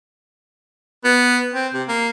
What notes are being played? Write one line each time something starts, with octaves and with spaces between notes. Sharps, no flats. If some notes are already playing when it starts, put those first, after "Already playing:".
B3
C4
C3
A#3